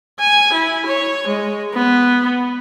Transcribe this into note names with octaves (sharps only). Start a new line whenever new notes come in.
G#5
E4
C#5
G#3
B3